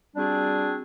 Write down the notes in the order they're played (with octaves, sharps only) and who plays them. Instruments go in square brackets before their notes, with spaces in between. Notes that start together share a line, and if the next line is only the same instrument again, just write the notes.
[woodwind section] G3 C4 D4 F#4 G#4